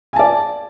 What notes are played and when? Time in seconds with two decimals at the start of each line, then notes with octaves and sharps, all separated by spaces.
0.13 G#5
0.16 A5
0.19 D5